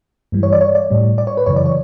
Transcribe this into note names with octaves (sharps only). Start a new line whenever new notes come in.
G2 E3 G3
C#5
D5
C#5
D5
A2 G3
D5
C#5
B4
F#2 C#3 E3 C#5
D5
C#5